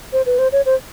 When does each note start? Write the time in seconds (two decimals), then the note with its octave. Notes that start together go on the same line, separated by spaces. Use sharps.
0.13 C5
0.26 B4
0.39 C5
0.52 C#5
0.66 C5